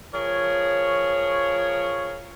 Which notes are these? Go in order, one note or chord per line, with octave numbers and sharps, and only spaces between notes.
F3 G#4 A#4 C#5